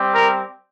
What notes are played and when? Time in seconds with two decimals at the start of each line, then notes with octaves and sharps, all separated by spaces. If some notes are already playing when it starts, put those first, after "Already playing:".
Already playing: G3 C4 G4
0.12 A#4